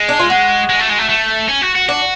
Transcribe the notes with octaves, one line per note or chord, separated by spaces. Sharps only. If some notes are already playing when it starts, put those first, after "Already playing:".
Already playing: G#3
D4
F4
F#4
G#3
A3
G#3
A3
A3
C#4
F#4
F#4
D4 F#4